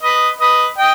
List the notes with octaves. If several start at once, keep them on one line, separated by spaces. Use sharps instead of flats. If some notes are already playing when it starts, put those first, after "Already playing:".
B4 D#5
B4 D#5
D#5 G5